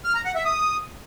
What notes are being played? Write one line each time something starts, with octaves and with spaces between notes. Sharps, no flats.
F6
A#5
F#5
E5
D#6